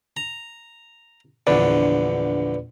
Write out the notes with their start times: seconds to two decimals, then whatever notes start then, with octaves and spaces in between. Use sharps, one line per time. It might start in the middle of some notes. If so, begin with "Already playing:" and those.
0.17 A#5
1.47 A#1 E2 D3 B4 D5